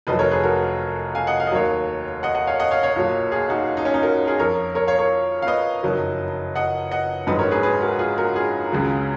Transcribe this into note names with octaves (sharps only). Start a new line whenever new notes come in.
F1 F2 D#3 F#3 B4 D#5
A#4 C#5
G#4 B4
F#4 A#4
F5 G#5
D#5 F#5
F5
D#5
D#2 D#3 F#3 C#5 F5
D#5 F#5
D#5 F#5
C#5 F5
D#5 F#5
C#5 F5
C#5 F5
B1 A#2 F#3
F4 G#4
D#4 F#4
D#4
C#4
D#4
F#4 A#4
F4 G#4
F2 F3 A#4 C#5
A#4 C#5
C#5 F5
A#4 C#5
F5
B4 D#5
F#1 F2 D#3 F#3
D#5 F#5
D#5 F#5
A#1 G#2 F#3 B4 D#5
A#4 C#5
G#4 B4
G#4 B4
F#4 A#4
F4 G#4
F#4 A#4
F4 G#4
C#2 C#3 F#3